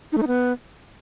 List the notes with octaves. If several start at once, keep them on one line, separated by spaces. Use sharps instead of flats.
D#4
A3
D#4
B3